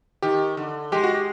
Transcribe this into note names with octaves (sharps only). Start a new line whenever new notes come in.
D#3 G4
D3
G#3 G4
F#4
G4